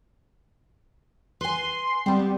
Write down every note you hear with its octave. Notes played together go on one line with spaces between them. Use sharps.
B4 G#5 C6
G3 B3 C4